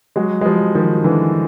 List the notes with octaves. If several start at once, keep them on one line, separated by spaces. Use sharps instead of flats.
F#3 G#3
G#3
F3 G3
D#3 F3
D3 E3